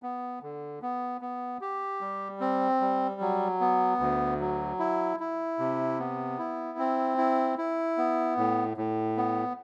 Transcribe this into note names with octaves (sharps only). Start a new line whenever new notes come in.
B3
D3
B3
B3
G4
G3
C4
G3
F#3
B3
D2
F#3
E4
E4
C3
B3
E4
C4
E4
E4
B3
A2
A2
B3